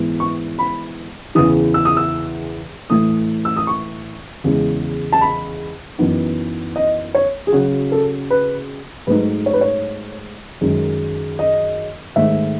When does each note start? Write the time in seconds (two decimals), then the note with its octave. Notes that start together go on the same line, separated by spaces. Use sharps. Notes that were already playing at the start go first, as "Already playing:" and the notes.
Already playing: G#2 E3 B3
0.20 C#6
0.59 B5
1.35 E2 C#3 E3 D#6
1.74 E6
1.85 D#6
1.97 E6
2.90 A2 E3 A3 D#6
3.45 E6
3.57 D#6
3.67 C#6
4.44 E2 C#3 G#3
5.13 A5
5.21 B5
5.98 F#2 E3 B3 D#4
6.76 D#5
7.15 C#5
7.47 G#4
7.53 C#3 F#3 C#4 F#4
7.92 A4
8.30 B4
9.07 G#2 F#3 A3 D#4 B4
9.46 C#5
9.53 B4
9.61 C#5
10.61 F#2 D#3 G#3
11.39 D#5
12.16 G#2 D#3 A3 D#4 E5